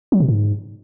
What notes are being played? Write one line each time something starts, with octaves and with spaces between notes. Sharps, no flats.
F#3
B2
G#2